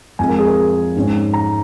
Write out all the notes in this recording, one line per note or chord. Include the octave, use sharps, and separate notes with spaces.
F2 F3 G#3 G#5
A#4
G#4
A#4
G#2 G#3 C#4
A#5